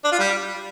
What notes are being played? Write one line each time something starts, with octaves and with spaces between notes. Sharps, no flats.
D4
F4
G3